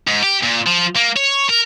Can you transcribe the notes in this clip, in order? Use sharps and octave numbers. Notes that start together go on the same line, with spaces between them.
G#2
G4
A#2
F3
A#3
C#5
A#4